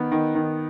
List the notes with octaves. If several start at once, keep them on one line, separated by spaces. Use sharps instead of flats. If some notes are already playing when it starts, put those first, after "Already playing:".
Already playing: D#3 B3
D#3
D#3